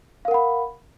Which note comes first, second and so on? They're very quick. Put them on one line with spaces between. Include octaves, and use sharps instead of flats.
F5 A#4 F#5 B5